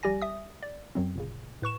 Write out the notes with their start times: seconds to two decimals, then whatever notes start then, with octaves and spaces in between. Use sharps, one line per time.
0.03 A#1 G3 G4 D5 G#5 A#6
0.22 E5 D#6
0.63 D5
0.95 F#2 F#3 C4
1.15 G1 A#2 C#3
1.62 A2 B4 C#6 E7